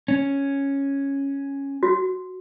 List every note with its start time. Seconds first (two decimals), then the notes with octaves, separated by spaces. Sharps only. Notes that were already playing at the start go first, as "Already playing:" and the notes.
0.08 C#4
1.83 F#4